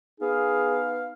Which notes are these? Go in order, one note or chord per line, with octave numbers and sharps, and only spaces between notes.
B3 D#4 G#4 F5